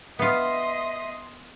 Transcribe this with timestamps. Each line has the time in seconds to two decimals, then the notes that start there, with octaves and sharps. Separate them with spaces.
0.19 B3 F4 D#5 E5 C6